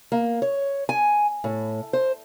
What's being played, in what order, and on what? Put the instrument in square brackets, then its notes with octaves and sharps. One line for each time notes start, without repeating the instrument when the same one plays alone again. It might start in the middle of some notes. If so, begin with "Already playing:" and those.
[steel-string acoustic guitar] A#3
C#5
G#5
A2
C5